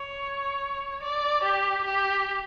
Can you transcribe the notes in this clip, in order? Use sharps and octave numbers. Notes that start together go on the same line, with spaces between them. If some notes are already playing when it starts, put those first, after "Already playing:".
Already playing: C#5
D5
G4
G4